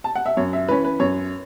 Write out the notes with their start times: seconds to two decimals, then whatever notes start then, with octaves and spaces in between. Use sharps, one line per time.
0.04 A5
0.15 F#5
0.26 E5
0.37 F#2 C#5
0.53 E5
0.68 E3 C#4 B4
0.84 B4
0.99 F#2 C#5